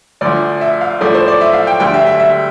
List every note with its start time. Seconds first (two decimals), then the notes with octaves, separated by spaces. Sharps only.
0.21 D2 D3 F3 D5
0.61 E5
0.81 F5
1.01 A2 F3 A3 D5
1.14 C5
1.28 D5
1.41 E5
1.54 F5
1.67 G5
1.80 D2 D3 G3 G5
1.94 E5
2.06 E5
2.20 E5